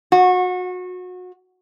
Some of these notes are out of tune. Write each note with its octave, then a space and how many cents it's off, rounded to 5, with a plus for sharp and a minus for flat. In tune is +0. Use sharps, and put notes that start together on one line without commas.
F#4 -30